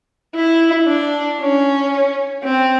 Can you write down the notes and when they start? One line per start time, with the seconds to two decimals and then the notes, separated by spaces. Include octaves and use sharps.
0.35 E4
0.87 D4
1.40 C#4
2.43 C4